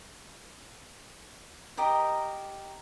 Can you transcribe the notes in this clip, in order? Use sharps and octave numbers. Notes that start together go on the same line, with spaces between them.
G4 A#4 D#5 G5